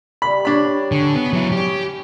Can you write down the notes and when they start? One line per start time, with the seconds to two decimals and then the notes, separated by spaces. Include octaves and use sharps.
0.22 G3 B5
0.45 D4 C#5 B5
0.92 D3 G#4 C#5
1.15 B3
1.33 F#3 E4
1.52 C#4 E4 G4